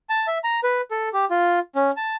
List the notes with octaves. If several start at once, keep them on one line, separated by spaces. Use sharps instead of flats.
A5
E5
A#5
B4
A4
G4
F4
C#4
A5